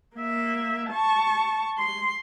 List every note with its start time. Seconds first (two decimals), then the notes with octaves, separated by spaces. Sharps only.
0.17 A#3 E5
0.90 A5 C#6
1.78 C6